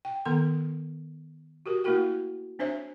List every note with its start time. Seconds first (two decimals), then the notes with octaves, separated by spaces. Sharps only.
0.05 G5
0.25 D#3 B3 A4 C6
1.66 F#4 G4 A#4
1.84 A3 A#3 E4 F#4 A#4 G5
2.59 C4 D4 C5 C#5 E5